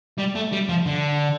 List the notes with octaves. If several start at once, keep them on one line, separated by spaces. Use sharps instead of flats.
G3
A3
G3
F3
D3